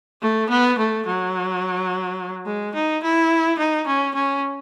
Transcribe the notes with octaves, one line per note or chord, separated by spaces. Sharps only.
A3
B3
A3
F#3
G#3
D#4
E4
D#4
C#4
C#4